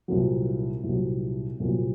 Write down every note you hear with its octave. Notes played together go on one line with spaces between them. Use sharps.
C2 A#2 F#3
C2 A#2 F#3
C2 A#2 F#3